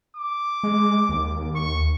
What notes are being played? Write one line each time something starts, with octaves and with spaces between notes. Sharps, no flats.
D6
G#3
D#2
C#6